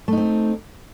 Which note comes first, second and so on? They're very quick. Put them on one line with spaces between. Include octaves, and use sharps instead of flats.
A3 D#4 C4